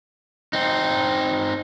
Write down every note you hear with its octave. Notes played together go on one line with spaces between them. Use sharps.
C4 D#4